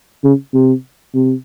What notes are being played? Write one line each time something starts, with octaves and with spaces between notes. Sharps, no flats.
C#3
C3
C3